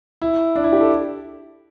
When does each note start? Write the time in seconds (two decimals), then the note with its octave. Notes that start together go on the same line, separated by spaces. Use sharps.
0.22 E4
0.56 D4
0.64 E4
0.73 G4
0.81 A4